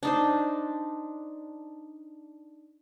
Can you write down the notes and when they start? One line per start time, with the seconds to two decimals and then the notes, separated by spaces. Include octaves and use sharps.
0.03 D4 D#4 C5